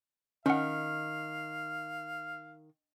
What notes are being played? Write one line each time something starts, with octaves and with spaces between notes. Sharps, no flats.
D#3 C#4 F5 F#5